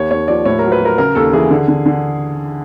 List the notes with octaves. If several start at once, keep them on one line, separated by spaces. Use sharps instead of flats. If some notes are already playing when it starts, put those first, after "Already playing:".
Already playing: D#2 C#5
D#2 C#5
F3 D5
A2 C#5
A#4
F#3
B4
F#3 A#4
C#3 A#4
D#2 A4
E3 G#4
D3
D3
D3